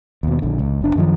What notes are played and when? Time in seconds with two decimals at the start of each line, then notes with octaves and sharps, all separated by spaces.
0.23 D#2 B2
0.42 A#1 D3
0.59 C#2
0.81 F#1 D4
0.96 F#2 D#3 F3